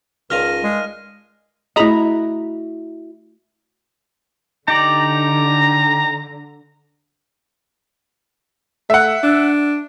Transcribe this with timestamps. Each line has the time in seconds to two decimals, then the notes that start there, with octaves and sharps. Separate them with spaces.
0.30 C#2 D#3 D4 F4 F6 A#6 D#7
0.63 G#3
1.76 A3 E4 F#4 G#4 D#5 A#5 B5
4.68 D3 D#4 G4 D5 A#5
8.90 A3 E5 F#5
9.23 D4